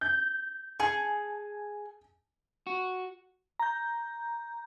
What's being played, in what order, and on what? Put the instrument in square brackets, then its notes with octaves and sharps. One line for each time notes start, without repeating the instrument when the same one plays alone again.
[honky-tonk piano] G6
[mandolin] G#4 [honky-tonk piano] G#5 A5 C#7
[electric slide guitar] F#4
[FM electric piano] A#5 G6